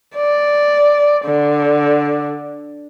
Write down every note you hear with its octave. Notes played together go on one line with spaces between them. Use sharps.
D5
D3